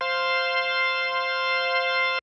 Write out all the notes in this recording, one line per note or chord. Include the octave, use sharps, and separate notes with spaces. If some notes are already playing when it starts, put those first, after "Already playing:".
C5 F5 C6